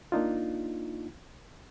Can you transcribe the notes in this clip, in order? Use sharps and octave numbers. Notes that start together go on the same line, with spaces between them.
A#3 D4 D#4 F4